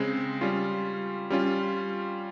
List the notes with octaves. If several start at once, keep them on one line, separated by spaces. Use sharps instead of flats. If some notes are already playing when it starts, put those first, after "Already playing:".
Already playing: C#3 G#3 C4
G3 C#4 F4
G3 C#4 F4